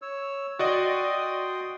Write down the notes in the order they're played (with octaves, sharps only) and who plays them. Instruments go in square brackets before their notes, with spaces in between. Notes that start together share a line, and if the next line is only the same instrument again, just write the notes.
[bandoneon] C#5 E6
[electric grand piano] F#4 D5 D#5 [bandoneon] G5 C6 D#6